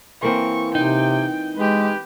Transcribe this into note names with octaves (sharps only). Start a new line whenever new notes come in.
E3 A#3 C4 C#6
C3 D#4 G5
G#3 G4 B4